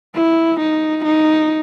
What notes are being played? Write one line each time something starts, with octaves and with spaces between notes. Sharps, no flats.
E4
D#4
D#4